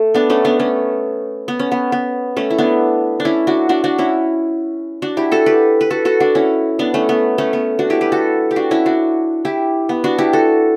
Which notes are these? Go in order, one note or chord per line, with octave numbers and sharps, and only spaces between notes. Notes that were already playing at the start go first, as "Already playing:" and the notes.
Already playing: A3 A4
B3 D4
A3 C#4
B3 D4
A3 C#4
B3
C#4
B3
B3
A3 C#4
E4
B3 D4
D4
C#4 E4
D4 F#4
D4 F#4
D4 F#4
C#4 E4
D4 F#4
E4 G4
F#4 A4
G4 B4
B4
F#4 A4
F#4 A4
D4 F#4
C#4 E4
B3 D4
A3 C#4
B3
A3 C#4
B3
D4 F#4
E4 G4
G4 B4
F#4 A4
G4
D4 F#4
C#4 E4
D4 F#4
E4 G4
B3
D4 F#4
E4 G4
F#4 A4